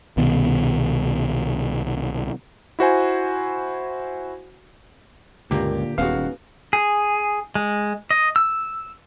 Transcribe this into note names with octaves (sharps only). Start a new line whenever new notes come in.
C2 B2 D#3 B3
E4 F#4 C5 G#5
C#2 G2 A#2 D3 A#3 G4
D#1 E2 G#2 G#3 B3 C#4 F#4 F5
G#4
G#3
D#5
E6